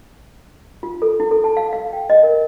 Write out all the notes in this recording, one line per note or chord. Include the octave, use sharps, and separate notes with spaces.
F4
A4
E4
A4
A5
F5
F5
G5
D#5
A#4